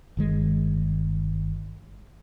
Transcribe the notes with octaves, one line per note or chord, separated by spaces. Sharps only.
G1 D#3 G#3